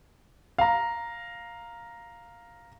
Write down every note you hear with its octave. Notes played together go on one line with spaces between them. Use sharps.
F5 A#5